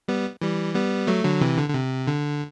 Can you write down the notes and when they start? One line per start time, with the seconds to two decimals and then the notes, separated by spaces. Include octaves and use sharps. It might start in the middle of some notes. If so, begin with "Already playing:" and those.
0.08 G3 B3
0.41 E3 G3
0.75 G3 B3
1.07 F#3 A3
1.24 D3 F#3
1.41 C3 E3
1.57 D3
1.69 D3
1.74 C3
2.07 D3